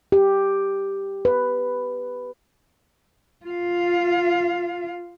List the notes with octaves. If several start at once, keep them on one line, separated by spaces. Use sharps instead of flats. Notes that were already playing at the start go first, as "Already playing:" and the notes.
G4
B4
F4 F5